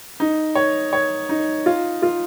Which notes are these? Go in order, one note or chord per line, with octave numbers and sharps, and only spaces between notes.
D#4
C#5
C#5
D#4
F4
F4